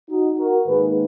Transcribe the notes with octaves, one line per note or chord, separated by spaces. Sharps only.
D#4 F#4
F#4 A#4
G#2 D#3 A#3 G#4 B4